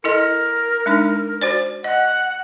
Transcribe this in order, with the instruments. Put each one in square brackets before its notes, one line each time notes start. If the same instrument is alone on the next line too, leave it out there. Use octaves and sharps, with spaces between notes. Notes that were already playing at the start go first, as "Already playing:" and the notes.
[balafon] E4 A4 D#5 [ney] A#4
[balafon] G#3 D4 D#4
F#4 C5 D5
[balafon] D#5 [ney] F#5